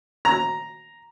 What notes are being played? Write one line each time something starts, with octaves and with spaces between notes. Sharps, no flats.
A#5